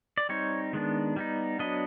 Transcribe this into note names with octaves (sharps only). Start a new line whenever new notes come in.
D5
G3 C4 D#4 C#5
D#3 G#3 B3 D4
G3 B3 D#4
F#3 B3 D4 D#5